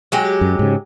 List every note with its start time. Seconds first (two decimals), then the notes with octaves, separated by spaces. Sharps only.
0.12 F#3 G#3 G4
0.41 F#2
0.59 G#2 C#3